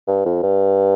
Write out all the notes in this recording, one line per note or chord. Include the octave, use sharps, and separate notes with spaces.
G2
F2
G2